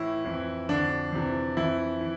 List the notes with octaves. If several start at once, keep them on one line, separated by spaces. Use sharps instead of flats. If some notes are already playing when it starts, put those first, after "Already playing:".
Already playing: A2 E3 E4
F2 E3
F2 D3 D4
F2 C3 E3
F2 E3 E4
E3